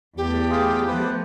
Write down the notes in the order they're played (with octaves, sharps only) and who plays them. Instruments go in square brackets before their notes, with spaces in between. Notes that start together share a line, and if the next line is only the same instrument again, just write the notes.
[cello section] E2 A3 B3 [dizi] G4
[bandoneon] F4 G#4
[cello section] F3 A3 B3 [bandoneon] B4 C5